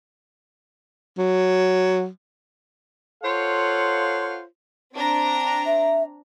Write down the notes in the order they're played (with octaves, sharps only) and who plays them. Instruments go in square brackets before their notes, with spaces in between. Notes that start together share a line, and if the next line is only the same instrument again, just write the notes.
[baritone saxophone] F#3
[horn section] F4 A4 C5 C#5 F5 F#5
[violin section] C4 D4 A#5
[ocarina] E5